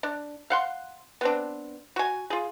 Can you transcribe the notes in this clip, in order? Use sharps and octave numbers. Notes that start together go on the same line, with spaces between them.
D4
F5 F#5 C6
B3 C4 D4
F#4 G#5
F4 G#4